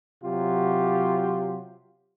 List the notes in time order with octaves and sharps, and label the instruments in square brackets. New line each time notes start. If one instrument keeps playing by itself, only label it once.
[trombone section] C3 F#3 F4 G4